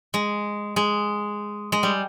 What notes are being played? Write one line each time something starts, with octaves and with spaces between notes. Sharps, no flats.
G#3
G#3
G#3
G3